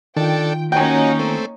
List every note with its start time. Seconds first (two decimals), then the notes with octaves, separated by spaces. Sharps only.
0.17 D#3 D4 F4 A4 G5
0.72 A#3 C#4 D#4 F#4 G5 G#5
1.19 A3 C4